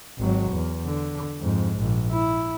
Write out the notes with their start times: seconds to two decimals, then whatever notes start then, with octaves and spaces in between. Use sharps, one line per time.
0.18 G#1 F#3
0.51 E2
0.85 D3
1.39 F2 G#2
1.78 A#1
2.12 E4